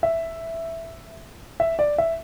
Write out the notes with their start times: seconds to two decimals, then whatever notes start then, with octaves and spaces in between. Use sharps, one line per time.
0.03 E5
1.60 E5
1.79 D5
1.98 E5